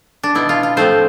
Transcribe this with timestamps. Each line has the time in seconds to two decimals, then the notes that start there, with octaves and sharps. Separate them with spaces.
0.23 D4
0.35 B2 B3 E4
0.49 F4
0.63 F4
0.77 A2 F3 A3 C4 C5